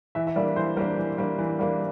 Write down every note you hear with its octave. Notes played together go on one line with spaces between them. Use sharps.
E3 E5
E5
G3 A#3 D4 D5
E3 C5
G3 A#3 D4 A#4
E3
G3 A#3 D4
E3
G3 A#3 D4